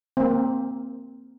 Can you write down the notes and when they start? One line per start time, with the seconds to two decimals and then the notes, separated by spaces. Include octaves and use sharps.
0.17 A#3 C4